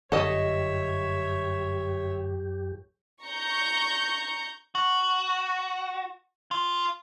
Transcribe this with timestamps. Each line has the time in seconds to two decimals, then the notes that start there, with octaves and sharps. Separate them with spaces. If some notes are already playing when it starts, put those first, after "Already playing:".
0.12 G1 F#2 G4 A4 C#5 D#5 E5
3.24 A#5 C#6 G6
4.75 F#4
6.51 F4